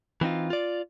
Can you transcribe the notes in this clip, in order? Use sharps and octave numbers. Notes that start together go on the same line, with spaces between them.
E3 C4 D#4 F4
F4 D5